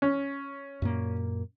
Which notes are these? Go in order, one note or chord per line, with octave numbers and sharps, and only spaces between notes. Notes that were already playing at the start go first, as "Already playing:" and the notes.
C#4
F#2 A#2 A#3